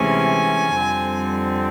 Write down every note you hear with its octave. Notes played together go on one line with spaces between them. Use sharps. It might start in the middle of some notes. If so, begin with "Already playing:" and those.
Already playing: D2 C3 E3 G#3 C#4 G#5
F2 D3 G3 C4